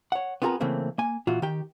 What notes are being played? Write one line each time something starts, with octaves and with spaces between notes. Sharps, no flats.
C#5 F#5
B3 C4 F4 G#4 A#4 A#5
C#3 E3 A3 A#3 C4
A#3 G#5
A#2 E3 F4 F#4
D#3 G4 G5